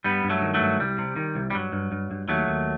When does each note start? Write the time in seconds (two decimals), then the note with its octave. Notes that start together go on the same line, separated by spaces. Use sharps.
0.04 G2 G3 B3
0.24 G2
0.30 F#3 A3
0.42 D#3
0.54 F#3 A3
0.60 G2
0.80 C2 G3
0.98 C3
1.16 D#3
1.35 C2
1.50 G3
1.54 G2 F#3
1.73 G2
1.92 G2
2.11 G2
2.28 D#2 F#3 A3
2.47 D#2